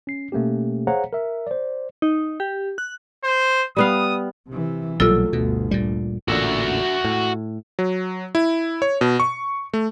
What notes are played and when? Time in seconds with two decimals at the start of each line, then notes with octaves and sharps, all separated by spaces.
0.07 C#4 C7
0.32 B2 A3 A#3 C#4 G4
0.87 G#4 C5 C#5 F5 F#5 A#5
1.13 A#4 E5
1.47 C5 D5
2.02 D#4
2.40 G4
2.78 F#6
3.24 C5
3.77 G3 B3 F5 D#6
4.49 C3 E3
5.00 B1 A#2 F#3 G3 A3 F4 A4 E6
5.33 G1 D2 B2
5.71 A#2 G3
6.28 A1 A#2 D3 F#4 E5
7.05 A2
7.79 F#3
8.35 E4
8.82 C#5
9.01 B2
9.20 C#6
9.74 A3